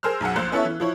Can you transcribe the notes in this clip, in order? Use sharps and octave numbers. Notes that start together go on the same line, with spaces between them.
G#4 A#4 C5 E6 F6
B1 F#2 G#4 F#5
A#1 A#2 C5 F#6
B3 C#4 E4 A4 C#5 E5
E3
F3 E4 C#5